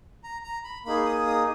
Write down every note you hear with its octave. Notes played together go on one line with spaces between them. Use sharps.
A#5
A#5
B5
A#3 D#4 G#4 B5
D#6
D#6